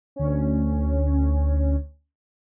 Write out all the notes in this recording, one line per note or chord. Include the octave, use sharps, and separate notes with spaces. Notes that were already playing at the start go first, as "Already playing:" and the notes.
D2 C#4